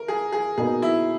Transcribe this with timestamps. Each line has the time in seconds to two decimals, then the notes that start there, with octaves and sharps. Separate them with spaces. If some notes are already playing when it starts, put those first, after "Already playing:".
Already playing: A#4
0.08 G#4
0.32 G#4
0.58 B2 A#3 D#4 G#4 A#4
0.82 E4